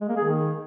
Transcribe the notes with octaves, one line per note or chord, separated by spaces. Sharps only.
G#3
A#3
G#4
D#3